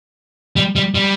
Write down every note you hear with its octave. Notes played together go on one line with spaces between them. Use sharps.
G3
G3
G3